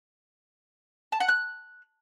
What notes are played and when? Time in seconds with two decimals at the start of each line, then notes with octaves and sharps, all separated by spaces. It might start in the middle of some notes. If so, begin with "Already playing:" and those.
1.12 A5
1.20 F#5
1.28 F#6